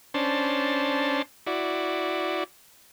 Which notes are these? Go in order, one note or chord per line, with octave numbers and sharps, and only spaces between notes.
C#4 D4 C5 A5
E4 F#4 D5